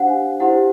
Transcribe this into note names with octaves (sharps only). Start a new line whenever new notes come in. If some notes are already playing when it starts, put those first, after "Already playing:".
Already playing: D4 G4 C5 F5 F#5
G#5
E4 G4 C5 F#5